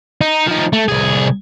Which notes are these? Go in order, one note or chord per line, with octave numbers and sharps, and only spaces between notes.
D#4
F3 D#4
A3
C2 G#4